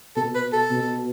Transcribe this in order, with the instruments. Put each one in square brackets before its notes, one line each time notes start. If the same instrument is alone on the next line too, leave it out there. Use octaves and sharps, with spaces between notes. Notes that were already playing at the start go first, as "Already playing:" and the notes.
[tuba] B2 [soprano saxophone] A4
[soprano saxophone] B4
A4
[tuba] B2